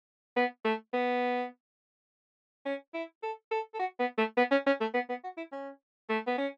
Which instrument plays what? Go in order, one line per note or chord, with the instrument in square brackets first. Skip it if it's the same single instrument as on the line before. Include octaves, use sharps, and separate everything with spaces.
[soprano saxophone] B3
A3
B3
C#4
E4
A4
A4
A4
F#4
B3
A3
B3
C#4
C#4
A3
B3
B3
F#4
E4
C#4
A3
B3
C#4